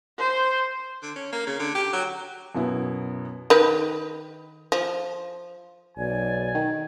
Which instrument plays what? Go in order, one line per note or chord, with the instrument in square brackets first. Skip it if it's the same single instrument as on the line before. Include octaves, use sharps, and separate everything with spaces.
[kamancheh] C5
[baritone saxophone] D3
C#4
A#3
C#3
D3
G4
F#3
[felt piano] F#2 B2 B3 E4
[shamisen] D#3 B4
F3
[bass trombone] B1 [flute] D5 [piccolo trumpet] G#5
[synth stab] D#3